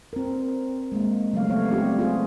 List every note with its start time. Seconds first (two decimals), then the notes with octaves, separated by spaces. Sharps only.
0.13 C4 A#4
0.92 G#3 A#3
1.33 C#3 F#3 G3 A3 C#4 F5
1.48 A3 B3 C4 C#5 F5
1.70 G3 C4 D4 F4 G4
1.99 F4 G#4